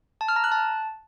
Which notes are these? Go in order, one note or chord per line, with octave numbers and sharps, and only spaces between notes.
A5
F6
A#5
F#6
A5